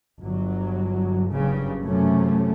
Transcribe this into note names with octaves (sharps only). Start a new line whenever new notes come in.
G1 F#3
F#1 G2 C#3
F#2 C3 A3 C#4